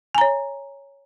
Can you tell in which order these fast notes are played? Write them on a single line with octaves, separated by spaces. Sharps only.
G#5 A#5 C#5